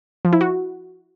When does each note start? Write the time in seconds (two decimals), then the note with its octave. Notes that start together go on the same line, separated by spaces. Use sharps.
0.25 F3
0.33 E4
0.41 F#4